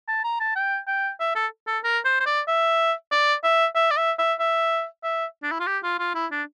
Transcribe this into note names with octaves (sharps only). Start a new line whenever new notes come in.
A5
A#5
A5
G5
G5
E5
A4
A4
A#4
C5
C5
D5
E5
D5
E5
E5
D5
E5
E5
E5
E5
D4
E4
F4
G4
F4
F4
E4
D4